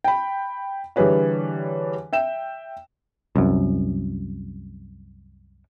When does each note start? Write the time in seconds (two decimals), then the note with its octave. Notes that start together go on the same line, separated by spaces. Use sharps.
0.04 G5 B5
0.96 D3 E3 G3 G#4 B4 C#5
2.13 E5 G5 E7
3.36 C2 F#2